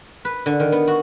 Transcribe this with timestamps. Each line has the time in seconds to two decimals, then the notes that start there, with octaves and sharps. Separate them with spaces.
0.25 B4
0.46 D3
0.60 D#3
0.72 B3
0.87 F#4